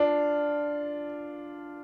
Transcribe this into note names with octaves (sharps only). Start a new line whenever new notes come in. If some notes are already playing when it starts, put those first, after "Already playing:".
Already playing: D4 F4